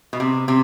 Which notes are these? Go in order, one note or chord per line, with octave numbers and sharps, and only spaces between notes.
B2
C3
C3